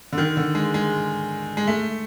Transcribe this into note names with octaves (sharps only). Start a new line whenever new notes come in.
D3
D#3
D3
G#3
G#3
G#3
A3